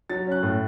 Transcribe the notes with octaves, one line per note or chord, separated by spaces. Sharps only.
F#3 A6
C#4 F#6
A2